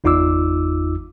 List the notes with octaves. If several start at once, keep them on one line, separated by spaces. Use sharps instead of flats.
G1 E2 D#4 F4 D6 E6